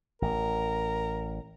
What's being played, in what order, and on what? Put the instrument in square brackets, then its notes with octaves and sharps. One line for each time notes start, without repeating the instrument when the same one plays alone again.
[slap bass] A1 [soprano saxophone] A#4